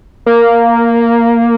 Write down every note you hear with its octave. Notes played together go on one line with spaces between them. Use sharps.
A#3